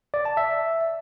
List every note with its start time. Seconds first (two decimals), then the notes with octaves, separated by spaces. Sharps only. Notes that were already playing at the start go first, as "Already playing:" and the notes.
0.14 D5
0.25 A5
0.37 E5